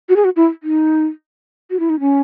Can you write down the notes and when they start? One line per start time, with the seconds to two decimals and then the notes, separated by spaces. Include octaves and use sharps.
0.09 F#4
0.16 G#4
0.25 F#4
0.36 E4
0.63 D#4
1.70 F#4
1.80 E4
1.90 D#4
2.00 C#4